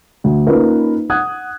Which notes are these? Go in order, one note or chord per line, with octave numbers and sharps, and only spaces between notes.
D2
A#3 C#4 D#4 F4 A#4 B4
F#5 D#6 F#6 G#6